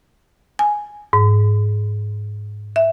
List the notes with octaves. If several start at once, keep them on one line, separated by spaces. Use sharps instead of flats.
G#5
G#2
E5